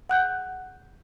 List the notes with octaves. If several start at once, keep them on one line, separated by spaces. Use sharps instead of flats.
F#5 F#6 G6